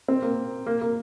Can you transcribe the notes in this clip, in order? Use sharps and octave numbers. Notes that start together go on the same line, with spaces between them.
C4
A#3
A#3
A#3